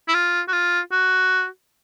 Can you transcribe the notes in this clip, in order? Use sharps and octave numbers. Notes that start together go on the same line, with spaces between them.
E4
F4
F#4
F4
F#4